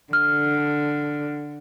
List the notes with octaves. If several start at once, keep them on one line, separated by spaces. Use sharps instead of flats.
D3 F6